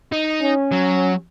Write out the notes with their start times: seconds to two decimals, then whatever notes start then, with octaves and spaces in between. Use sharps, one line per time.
0.12 D#4
0.41 C#4
0.73 F#3